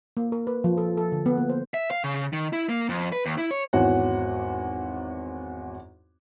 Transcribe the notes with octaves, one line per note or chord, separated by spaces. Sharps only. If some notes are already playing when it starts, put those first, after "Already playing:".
A#3
A#4
B4
F3
A4
A4
D3
B3
A#3
C5
E5
F5
C#3
D#3
E4
A#3
F2
B4
D#2
E4
C#5
G#1 E2 F#4 C#5 F#5